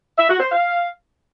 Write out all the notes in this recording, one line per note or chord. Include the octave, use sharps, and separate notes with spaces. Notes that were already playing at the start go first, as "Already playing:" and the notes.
E5
F#4
C5
F5